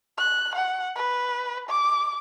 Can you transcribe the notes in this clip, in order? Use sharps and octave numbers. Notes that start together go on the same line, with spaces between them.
F#6
F#5
B4
D6